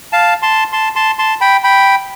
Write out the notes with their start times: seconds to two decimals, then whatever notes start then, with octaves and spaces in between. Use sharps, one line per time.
0.12 F5 A5
0.42 A5 C6
0.72 A5 C6
0.96 A5 C6
1.19 A5 C6
1.41 G5 B5
1.64 G5 B5